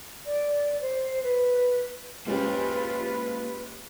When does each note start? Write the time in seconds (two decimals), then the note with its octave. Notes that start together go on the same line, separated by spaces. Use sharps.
0.25 D5
0.81 C5
1.23 B4
2.27 G#3 A#3 C#4 F4 G4 B4 C5 G#5